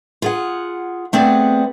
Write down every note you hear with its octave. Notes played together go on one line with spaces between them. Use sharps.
F4 G#4 F#5
A3 B3 C4 G#4 D5 F#5